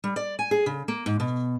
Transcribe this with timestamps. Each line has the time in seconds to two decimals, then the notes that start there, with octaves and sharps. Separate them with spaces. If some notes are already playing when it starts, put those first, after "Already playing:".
0.04 G3
0.16 D5
0.39 G#5
0.51 G#4
0.66 C#3
0.88 A#3
1.06 G#2
1.20 B2